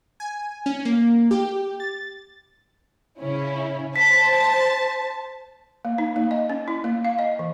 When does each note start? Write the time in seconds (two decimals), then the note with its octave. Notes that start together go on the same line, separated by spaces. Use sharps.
0.20 G#5
0.66 C#4
0.85 A#3
1.31 G4
1.80 A6
3.19 C#3 C#4 E4
3.96 C5 A5 B6
5.85 A#3
5.98 D#4
6.16 A#3
6.31 D#5
6.50 C#4
6.68 E4
6.84 A#3
7.05 F5
7.19 D#5
7.39 E3